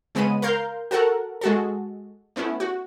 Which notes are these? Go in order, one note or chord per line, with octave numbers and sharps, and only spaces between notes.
C#3 G#3 B3 B5 D#7
A#4 F5 C6 G6
F#4 A4 A#4 F#5
G#3 F#4 A4
A3 B3 C#4 E4
F#4